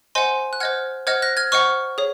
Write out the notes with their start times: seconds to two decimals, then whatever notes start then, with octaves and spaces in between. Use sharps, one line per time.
0.15 C5 D#5 F#5 G#5 C6
0.53 F#6
0.60 C5 D#5 F#5 F6 G#6
1.07 C5 D#5 F#5 F6 G#6
1.22 F#6 A#6
1.37 F6 G#6
1.52 C5 D#5 F#5 C#6 F6
1.98 G#4 C#5